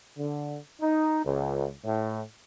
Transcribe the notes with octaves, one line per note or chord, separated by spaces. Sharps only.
D3
D#4
C#2
A2